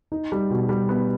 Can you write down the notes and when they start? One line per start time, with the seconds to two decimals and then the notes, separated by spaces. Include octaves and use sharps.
0.12 D#4
0.32 G3
0.50 B2
0.69 G3
0.89 B3